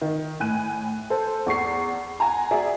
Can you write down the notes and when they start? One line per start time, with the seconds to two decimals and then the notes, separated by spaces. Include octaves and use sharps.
0.01 D#3
0.40 A2 G#5 F#6 D#7
1.10 A4 C5
1.46 E2 C#6 C7
2.20 F#5 G#5 A#5
2.51 F#4 G#4 D5 E5